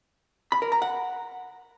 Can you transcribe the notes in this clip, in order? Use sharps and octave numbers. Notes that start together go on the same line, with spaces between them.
B5
A#4
A#5
F#5